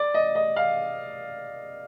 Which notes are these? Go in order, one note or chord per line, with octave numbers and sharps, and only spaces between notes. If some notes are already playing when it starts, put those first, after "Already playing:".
Already playing: D5
D#5
D#5
F5